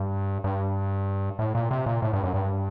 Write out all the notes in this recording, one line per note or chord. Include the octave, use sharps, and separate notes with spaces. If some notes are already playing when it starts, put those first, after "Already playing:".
Already playing: G2
G2
A2
A#2
C3
A#2
A2
G2
F#2
G2